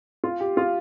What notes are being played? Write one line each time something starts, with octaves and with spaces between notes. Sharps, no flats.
F4
G4
F4